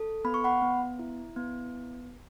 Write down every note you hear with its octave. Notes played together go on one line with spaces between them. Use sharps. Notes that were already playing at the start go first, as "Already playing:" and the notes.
Already playing: A4
B3 B5
C#6
F#5 B5
B3
E4
B3